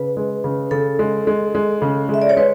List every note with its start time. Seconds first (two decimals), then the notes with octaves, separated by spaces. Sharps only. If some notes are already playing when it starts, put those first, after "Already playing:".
Already playing: C#3 B4
0.17 G#3
0.44 C#3
0.71 C#3 A4
0.99 G#3
1.27 G#3
1.55 G#3
1.82 C#3
2.09 G#3
2.14 E5
2.22 D5
2.29 C#5
2.37 G#3 B4